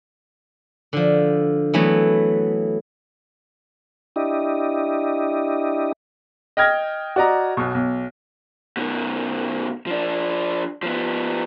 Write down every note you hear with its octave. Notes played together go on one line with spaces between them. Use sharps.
D3 F3
E3 F#3 A3 B3
D4 E4 G4 D#5
D#5 G5 F6 G#6 A#6
F#4 D5 D#5 A#5
B1 B2
B1
B2 D#3
F3 D4
F3 B3